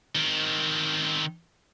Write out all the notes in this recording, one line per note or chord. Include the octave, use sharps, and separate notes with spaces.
D#3 C4